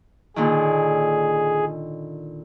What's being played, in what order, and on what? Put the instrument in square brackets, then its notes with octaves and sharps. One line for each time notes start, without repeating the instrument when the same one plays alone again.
[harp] A#2 D3 D#3 [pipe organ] G#4